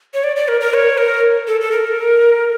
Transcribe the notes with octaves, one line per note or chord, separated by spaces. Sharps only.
C#5
D5
D5
A#4
A#4
C#5
A#4
A4
A4
A#4